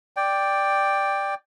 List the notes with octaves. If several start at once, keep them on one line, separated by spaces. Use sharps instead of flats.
D5 G5